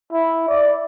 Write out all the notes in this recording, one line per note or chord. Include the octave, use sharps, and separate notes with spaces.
E4
D5